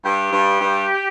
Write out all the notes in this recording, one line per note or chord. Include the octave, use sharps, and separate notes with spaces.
G2 G4
G2
G2